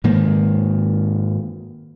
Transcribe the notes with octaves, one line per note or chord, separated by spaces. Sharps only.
G#2 D#3 A#3